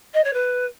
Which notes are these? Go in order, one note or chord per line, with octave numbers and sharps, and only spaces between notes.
D#5
C#5
B4